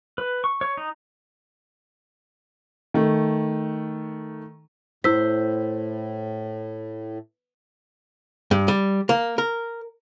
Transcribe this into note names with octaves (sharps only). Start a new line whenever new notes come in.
B4
C#6
C#5
D#4
D#3 A3
A2 E4 C5 E6 B6
G2
G3
A#3
A#4